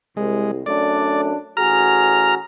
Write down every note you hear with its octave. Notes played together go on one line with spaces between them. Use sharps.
C2 G#3
F#2 A3 D4 D5
A1 F#4 G#4 A#5 F6